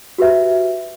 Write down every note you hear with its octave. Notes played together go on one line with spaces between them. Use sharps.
F#4 G4 B4 E5